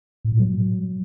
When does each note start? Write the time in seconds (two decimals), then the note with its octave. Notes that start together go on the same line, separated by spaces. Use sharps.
0.25 A2
0.32 A#2
0.39 F#3